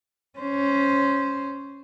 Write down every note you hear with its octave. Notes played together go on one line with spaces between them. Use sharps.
C#4 C5